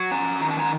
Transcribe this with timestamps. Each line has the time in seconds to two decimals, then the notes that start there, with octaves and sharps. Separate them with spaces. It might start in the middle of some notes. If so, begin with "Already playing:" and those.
Already playing: F#3
0.11 C#4 G#5 A#5
0.41 D#3 A#5
0.51 A5
0.59 G#5 A#5